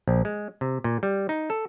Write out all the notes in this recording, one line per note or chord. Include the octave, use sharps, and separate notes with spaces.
A#1
G#3
C3
A#2
G3
D#4
A4